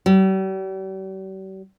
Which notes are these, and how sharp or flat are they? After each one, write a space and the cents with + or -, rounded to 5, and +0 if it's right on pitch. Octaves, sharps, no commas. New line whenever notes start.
G3 -45